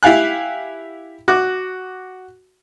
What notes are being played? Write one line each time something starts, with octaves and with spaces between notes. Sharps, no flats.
E4 G4 F5 G#5 F#6
F#4 D6 F#6